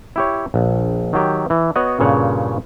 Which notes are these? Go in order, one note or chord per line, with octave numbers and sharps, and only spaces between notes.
E4 G4 C#5
A#1
D#3 F#3 G4
E3
B3 F#4 C#5 D#5 F#5
G2 A#2 C#3 C#5 F#5